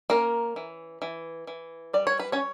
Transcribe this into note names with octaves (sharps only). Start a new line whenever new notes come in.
A#3 C#4 A#4
E3
E3
E3
G3 D5
C#5
B4
C#4 C#5